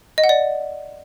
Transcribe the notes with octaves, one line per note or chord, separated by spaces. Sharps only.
D#5
F#5
D5